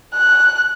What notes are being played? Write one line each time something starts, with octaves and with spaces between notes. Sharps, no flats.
F#6